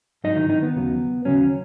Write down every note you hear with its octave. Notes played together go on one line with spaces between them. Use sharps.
G#2 F#3 D#4 D#5
D#3 D#4
D#3 D#4
B3
D#2 C#3 F#3
D#2 C#3 F#3 C#4